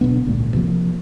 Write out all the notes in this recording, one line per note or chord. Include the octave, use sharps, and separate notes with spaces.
B1 B2 D3 B3
G#1 C#2 A#2
C3 F3 A#3